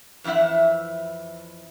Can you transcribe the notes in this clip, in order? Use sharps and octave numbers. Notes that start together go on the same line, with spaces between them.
F2 E3 C4 E5 F#5